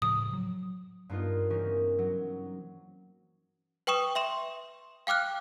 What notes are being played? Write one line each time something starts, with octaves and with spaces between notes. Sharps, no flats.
A2 C#3 F3 D#6
F#3
G2 A#3 B3 D#4 F4
E3 C4 C#4 D#4 A#4
F#3
B4 G5 C#6 D#6 E7
E5 C6 E7
F5 G5 D6 F6 F#6